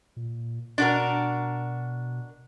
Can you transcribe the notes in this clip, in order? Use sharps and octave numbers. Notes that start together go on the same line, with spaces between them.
A#2
B2 D4 F#4 A#4